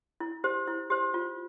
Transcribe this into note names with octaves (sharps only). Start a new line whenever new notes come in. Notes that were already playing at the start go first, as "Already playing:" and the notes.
E4
G4 C5
E4
G4 C5
F4